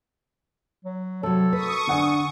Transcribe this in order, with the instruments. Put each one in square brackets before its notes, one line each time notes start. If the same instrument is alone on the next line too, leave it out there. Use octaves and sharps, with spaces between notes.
[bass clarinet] F#3
[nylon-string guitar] C3 F#3 [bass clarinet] A4
[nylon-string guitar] B4 [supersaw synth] C#6 D#6
[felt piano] D3 F#5 G#5 [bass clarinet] D4